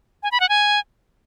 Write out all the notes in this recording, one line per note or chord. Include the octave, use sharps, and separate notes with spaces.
G#5
B5
F#5
G#5